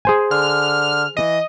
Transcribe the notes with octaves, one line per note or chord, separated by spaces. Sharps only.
G#4 C5 G#5
D3 F6
E3 D#5